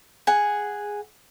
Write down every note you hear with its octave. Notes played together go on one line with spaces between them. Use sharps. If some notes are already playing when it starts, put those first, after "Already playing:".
G#4 F#5